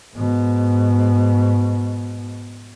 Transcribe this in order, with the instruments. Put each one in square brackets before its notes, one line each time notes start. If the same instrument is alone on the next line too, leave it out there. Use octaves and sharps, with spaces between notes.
[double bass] G#2 B2